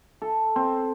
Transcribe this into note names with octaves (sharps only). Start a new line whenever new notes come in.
A4
C4